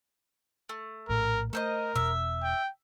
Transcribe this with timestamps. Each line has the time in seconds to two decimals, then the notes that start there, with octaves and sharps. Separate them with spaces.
0.69 A3
1.09 A#1 A2 A#4
1.53 A3 A4 A#4 C5 D#5
1.95 E1 B2 E5
2.43 G5